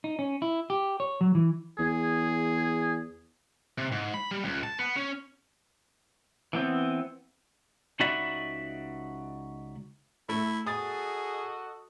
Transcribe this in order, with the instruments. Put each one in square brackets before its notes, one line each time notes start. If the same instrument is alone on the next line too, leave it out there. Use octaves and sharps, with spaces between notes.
[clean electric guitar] D#4
C#4
E4
G4
C#5
F#3
E3
[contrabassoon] E2 [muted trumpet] G#4
[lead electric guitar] C3
G#2
B5
G3
C#2
A5
B3
C#4
[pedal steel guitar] E3 B3 C4
[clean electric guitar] C#2 D#4 F#4 D5 E5 B5
[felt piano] A3 [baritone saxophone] E4
[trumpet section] F#4 A4 D#5 [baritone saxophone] G#4 [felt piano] D#6 A6